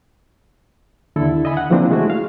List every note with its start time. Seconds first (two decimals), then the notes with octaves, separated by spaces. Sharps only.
1.16 D#2 D3 E4 A4
1.45 D#5 E5 G#5 B5
1.57 F#5
1.70 C#3 E3 F3 A#3 C4 D4
1.91 G#3 A3 E4 F#4
2.10 F5